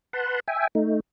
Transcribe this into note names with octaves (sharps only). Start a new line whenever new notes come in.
B4 F#5 A5 B5 C6
E5 G5 G#5
A3 D#4